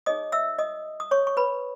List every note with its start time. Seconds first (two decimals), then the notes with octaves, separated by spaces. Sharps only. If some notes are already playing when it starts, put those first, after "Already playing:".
0.06 D#4 G#4 C#5 D#5 D#6
0.32 E5 E6
0.58 D#5 D#6
1.00 D#6
1.11 C#5 C#6
1.27 C#6
1.37 B4 B5